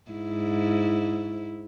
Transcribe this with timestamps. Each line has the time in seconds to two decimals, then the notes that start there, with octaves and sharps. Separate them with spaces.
0.11 G#2 E4